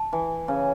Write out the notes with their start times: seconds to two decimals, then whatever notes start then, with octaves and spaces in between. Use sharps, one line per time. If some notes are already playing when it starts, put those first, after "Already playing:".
Already playing: A5
0.13 E3
0.48 C#3